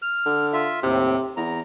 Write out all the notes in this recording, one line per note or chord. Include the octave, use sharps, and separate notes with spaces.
F6
D3
F4 E5
D#2 A2 C3 C4
E2 A#5